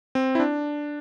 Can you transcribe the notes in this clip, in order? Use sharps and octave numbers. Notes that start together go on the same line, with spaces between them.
C4
E4
D4